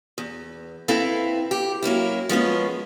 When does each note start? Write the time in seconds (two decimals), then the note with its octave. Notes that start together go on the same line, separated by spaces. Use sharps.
0.18 E2
0.88 C4 E4 A4 B4 F5
1.51 G4
1.83 F#3 A#3 C#4 E4
2.29 F3 G#3 B3 C#4